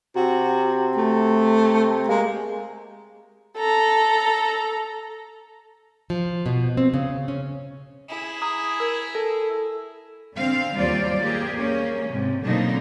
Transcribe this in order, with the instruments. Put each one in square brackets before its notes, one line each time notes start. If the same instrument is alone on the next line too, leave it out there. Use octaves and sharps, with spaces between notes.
[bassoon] C3 [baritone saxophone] F#4
[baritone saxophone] A3
[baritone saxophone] G#3 [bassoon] A#3
[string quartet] A4 A#5
[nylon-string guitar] F3
B2
C4
C#3
C#4
[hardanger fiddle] E4 G#4
[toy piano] A#5 [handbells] D#6
[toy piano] A#4
[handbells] A4
[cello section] D3 C4 F5
D#2 F#3 G3 F4 C5 D5
G#3 A#3 G4 G#4
A#3 C#4
G#2 C3
B2 D3 F#3 A#3 C4 D#4